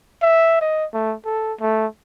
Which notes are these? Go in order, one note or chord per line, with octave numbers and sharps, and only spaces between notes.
E5
D#5
A3
A4
A3